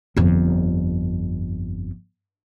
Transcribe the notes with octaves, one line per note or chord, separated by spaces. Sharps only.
G1 F2